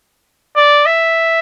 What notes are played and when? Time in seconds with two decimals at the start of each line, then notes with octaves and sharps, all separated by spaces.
0.56 D5
0.86 E5